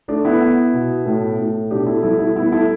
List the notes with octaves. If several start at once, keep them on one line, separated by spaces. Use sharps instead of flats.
A3 D4
B3 E4
B3
B2
A2
A2
B2 D4 G4
E4 A4
G3 E4 A4
E4 A4
A3 B3 E4
E4 A4